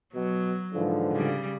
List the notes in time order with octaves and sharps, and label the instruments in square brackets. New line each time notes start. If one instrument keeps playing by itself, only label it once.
[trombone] B2 [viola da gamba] F#3
[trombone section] G#2 E3 F3 [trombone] D3
[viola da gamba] C#3 G3